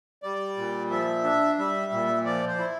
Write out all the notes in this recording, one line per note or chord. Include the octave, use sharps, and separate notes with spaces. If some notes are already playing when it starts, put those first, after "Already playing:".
G3 D5
A#2
F3 E5
D4
G3 E5
A#2
F3 D5
C5
E4